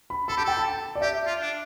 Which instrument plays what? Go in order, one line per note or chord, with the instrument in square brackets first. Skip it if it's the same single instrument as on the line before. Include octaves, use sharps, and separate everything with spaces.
[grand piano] B5
[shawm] A4 [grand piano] B5
[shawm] G4 [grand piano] A5
[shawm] A4 [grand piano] G5
[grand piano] A5
D5
[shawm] G4 [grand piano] E5
[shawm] F4
D4